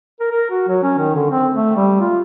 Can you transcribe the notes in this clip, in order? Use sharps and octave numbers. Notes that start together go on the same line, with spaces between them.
A#4
A#4
F#4
F#3
C#4
D#3
D3
C4
A3
G3
F4